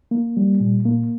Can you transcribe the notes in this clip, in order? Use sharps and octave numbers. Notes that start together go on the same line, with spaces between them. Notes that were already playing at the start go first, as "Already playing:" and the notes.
A#3
G3
A#2
A#3